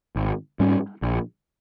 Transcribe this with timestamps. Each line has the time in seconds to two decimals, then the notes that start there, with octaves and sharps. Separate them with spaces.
0.16 G#1
0.60 G#2 G3 C#4
1.02 A#1